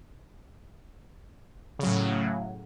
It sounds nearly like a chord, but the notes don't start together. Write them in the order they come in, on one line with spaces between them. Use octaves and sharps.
C#3 F#3 A2